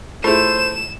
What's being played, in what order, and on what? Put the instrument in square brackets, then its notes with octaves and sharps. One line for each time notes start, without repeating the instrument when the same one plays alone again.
[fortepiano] A3 E4 [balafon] F4 G#4 [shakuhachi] C5 [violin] E7